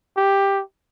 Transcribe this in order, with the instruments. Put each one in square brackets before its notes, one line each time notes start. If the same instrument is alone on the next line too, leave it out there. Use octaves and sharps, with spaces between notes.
[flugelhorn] G4